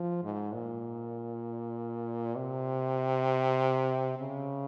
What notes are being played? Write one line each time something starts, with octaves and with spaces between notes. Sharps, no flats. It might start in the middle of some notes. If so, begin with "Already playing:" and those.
Already playing: F3
G#2
A#2
C3
C#3